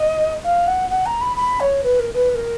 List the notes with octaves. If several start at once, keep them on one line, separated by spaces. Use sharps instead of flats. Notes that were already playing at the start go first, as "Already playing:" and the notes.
Already playing: D#5
F5
F#5
F#5
A#5
B5
B5
C#5
B4
A#4
B4
B4
A#4